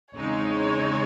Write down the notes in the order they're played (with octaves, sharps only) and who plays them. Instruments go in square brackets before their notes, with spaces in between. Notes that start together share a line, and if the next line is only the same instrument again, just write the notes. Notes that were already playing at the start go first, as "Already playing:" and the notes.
[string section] E2 C#3 G#3 C4 D#4 [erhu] C#5